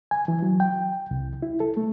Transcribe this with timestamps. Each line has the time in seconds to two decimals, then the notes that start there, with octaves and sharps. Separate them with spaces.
0.11 G#5
0.28 E3
0.43 F#3
0.60 G5
1.11 C2
1.43 E4
1.60 A4
1.77 A3